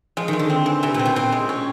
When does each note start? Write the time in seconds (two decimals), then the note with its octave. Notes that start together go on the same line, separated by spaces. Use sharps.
0.17 F3 G#3
0.28 D#3
0.33 G#3
0.39 D3
0.50 C4
0.66 E3
0.83 C3 E3
0.94 A#2
0.99 C4
1.05 B2
1.16 A#2 C4
1.32 G#3
1.49 C#4